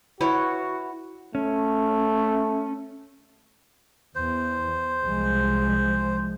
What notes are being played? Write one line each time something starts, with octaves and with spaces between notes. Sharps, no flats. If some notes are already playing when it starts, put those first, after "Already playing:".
E4 F#4 B4 C#5
A3 C#4
E2 C5
C2 F3 G#3